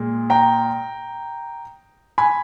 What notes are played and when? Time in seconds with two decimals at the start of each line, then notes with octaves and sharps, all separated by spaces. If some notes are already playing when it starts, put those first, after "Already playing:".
Already playing: A#2 G#3
0.30 G5 A#5
2.18 G#5 B5